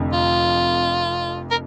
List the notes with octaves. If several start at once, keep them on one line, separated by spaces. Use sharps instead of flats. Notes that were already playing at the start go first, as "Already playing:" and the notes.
Already playing: F1 F2 D3
F4
A#4